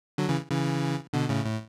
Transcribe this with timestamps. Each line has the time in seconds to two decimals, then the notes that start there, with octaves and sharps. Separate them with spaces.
0.18 D3 F#3
0.29 C#3 E3
0.50 C#3 E3
1.13 B2 D3
1.29 A2 C#3
1.45 A2